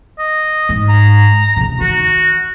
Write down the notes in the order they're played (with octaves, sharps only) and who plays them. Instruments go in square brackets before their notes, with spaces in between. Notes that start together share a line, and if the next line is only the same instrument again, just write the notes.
[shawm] D#5
[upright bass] G#2
[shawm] A#5
[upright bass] C#2 C3
[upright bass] D#3 [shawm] F#4